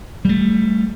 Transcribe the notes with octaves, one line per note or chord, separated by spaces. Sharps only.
G3 A3